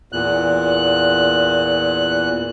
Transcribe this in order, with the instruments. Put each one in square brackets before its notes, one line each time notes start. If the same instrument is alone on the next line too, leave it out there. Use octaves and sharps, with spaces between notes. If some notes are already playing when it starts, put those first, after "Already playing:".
[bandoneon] E2 A#2 F#6